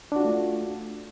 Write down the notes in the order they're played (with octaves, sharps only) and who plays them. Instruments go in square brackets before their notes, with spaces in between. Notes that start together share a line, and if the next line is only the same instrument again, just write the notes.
[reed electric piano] D4
F#4
F4
A3